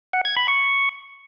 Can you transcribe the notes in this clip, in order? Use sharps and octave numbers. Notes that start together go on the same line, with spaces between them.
F#5
G#6
B5
C#6